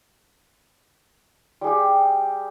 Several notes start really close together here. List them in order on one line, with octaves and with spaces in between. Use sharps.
G3 G#4 G4